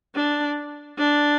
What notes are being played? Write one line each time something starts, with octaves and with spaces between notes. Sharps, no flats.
D4
D4